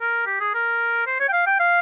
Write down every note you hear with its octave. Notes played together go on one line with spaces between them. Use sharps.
A#4
G4
G#4
A#4
C5
C#5
G5
F5
G5
F5